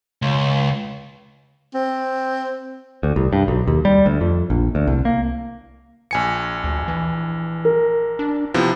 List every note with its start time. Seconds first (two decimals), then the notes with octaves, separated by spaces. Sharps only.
0.22 C#2
1.74 C4
3.03 D2
3.16 C2
3.33 G2
3.48 B1
3.67 D#2
3.85 G3
4.06 D2
4.21 F2
4.50 A#1
4.75 D2
4.87 C2
5.05 A#3
6.11 A#1 G#5 C#7
6.64 D2
6.88 E3
7.65 A#4
8.19 D4
8.54 C3 F3 B3 E4